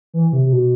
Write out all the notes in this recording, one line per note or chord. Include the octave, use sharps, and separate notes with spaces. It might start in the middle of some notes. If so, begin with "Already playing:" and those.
E3
C3
C3
B2